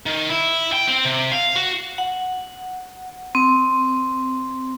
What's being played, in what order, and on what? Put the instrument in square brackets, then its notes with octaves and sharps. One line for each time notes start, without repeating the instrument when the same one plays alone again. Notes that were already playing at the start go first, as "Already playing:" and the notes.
[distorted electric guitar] D#3
E4
G5
C4
C3
F5
F#4
[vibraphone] F#5
C4